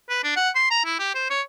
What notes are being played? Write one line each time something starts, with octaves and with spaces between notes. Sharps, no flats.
B4
D4
F#5
C6
A#5
E4
G4
C5
C#5